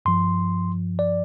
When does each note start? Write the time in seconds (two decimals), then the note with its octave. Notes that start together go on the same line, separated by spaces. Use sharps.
0.05 G2 F3 C6
0.99 D5